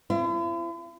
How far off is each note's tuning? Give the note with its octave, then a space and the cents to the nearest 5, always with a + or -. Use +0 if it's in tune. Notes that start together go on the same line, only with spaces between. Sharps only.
C4 +0 E4 +45